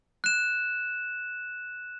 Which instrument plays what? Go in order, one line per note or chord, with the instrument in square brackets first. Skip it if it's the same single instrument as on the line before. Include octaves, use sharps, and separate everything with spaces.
[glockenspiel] F#6 E7